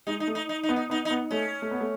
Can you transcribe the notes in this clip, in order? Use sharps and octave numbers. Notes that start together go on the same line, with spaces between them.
G#3 D#4
D#4
A3
D#4
D#4
D#4
B3
D#4
B3 D#4
D#4
B3
A3 C#4
A3
B3
A3